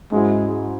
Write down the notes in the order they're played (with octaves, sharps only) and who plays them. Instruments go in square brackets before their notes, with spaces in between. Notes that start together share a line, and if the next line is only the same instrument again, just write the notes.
[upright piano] G#2 F#3 C#4 E4 [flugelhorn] G#3